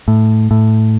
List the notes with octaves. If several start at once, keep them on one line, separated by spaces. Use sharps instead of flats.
A2
A2